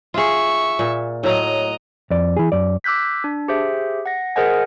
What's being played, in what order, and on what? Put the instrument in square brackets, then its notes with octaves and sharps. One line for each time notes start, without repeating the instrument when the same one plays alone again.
[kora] F4 G#4 [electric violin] E5 C#6
[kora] A#2
[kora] A2 F#3 [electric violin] D#5 A#5
[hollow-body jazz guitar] F2 D5
E3 G#4
F#2 D5
[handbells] D6 E6 F#6 G6 B6
D4
G4 G#4 C5 E5
F#5 A#6
G#4 A#4 C5 D#5 F#5 G#5